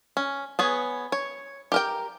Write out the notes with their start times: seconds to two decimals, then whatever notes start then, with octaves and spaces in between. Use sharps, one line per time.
0.17 C#4
0.59 B3 G#4 C#5
1.12 C#5
1.72 G4 A#4 G5